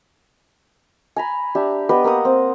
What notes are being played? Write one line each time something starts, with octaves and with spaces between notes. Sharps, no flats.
G#5 A#5 B5
D4 G4 E5
B3 G4 B4 D#5
A#3 A#4 F#5 D#6
C4